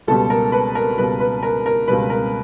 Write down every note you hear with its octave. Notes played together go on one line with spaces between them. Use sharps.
C#2 B2 G3 A4
A#4
B4
A#4
C#2 B2 G3 B4
B4
A#4
A#4
C#2 B2 G3 B4
A#4